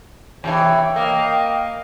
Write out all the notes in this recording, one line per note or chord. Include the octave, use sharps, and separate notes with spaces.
E2 C3 E3 C#5 G5
A#3 D#5 F5